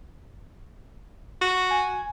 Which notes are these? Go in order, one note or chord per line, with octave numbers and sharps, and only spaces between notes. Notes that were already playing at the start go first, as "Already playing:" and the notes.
F#4
G#5